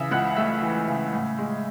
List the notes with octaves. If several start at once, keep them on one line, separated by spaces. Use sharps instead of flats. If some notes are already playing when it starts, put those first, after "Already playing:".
Already playing: C#3 E3 E5 D#6 E6
C#2 F#5 F#6
A3 E5 E6
E3
C#3
A2
G#3